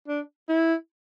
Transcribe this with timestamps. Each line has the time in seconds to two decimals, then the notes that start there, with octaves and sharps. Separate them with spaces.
0.08 D4
0.49 E4